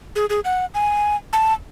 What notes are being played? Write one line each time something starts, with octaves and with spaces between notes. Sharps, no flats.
G#4
G#4
F#5
G#5
A5